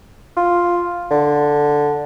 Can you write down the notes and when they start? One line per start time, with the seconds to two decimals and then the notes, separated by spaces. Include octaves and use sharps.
0.37 F4
1.11 D3